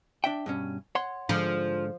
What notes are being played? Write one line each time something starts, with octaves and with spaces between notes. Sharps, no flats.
D4 E5 G5
G2 B2 C#4
C#5 F#5 C6
G#2 D3 F3